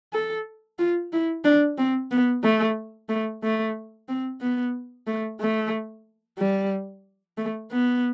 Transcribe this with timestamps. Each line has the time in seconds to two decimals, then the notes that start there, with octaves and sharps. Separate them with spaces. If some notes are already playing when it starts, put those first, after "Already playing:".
0.13 A4
0.79 F4
1.13 E4
1.45 D4
1.78 C4
2.11 B3
2.44 A3
3.09 A3
3.43 A3
4.09 C4
4.41 B3
5.07 A3
5.41 A3
6.38 G3
7.38 A3
7.71 B3